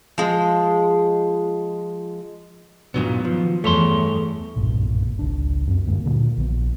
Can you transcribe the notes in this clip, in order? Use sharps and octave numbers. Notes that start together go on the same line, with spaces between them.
F3 G#3
B1 G2 A#2 D#3 F#3 B3
F3
E2 G2 A3 C#5 C6
F#1 B1 G2 A#2
G#1 C#2 D4
F#2 C4
D2 G2 G#3 A#3
A#2 D3 D#3 F#3
A#1 B3